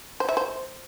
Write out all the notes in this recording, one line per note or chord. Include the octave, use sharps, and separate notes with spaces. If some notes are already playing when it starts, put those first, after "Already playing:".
C5
E5
C5